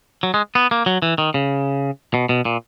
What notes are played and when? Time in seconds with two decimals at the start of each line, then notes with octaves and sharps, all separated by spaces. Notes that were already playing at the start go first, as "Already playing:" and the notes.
0.23 F#3
0.34 G#3
0.55 B3
0.71 A#3
0.86 F#3
1.02 E3
1.18 D#3
1.34 C#3
2.14 B2
2.29 B2
2.45 A#2